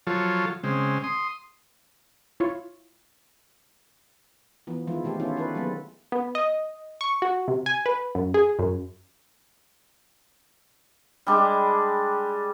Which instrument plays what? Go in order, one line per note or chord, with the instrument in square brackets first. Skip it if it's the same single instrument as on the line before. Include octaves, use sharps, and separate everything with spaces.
[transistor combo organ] F3 F#3 F4 A4 C#5
C#3 G#3 C4
C6 D#6
[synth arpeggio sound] E4 F4 C#5
[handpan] E3 F3 B3
D#3 F3 G#3 E4 F4
C3 A3 G4 A4
D#3 B3 C#4 E4 F4
E4 A4 B4
F#3 G#3 A#3 B3
[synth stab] B3
D#5
C#6
F#4
C3
G#5
B4
F#2
G#4
F#2
[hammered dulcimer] G3 G#3 D4 G4